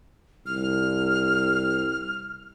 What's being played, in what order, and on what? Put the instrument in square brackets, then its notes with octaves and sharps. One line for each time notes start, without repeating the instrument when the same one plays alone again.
[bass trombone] C2 [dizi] F6